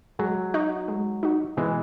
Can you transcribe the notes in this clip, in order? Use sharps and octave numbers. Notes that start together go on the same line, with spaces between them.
F#3 G#3
D#4 F#4
G#3
D#4 F#4
B2 E3 G#3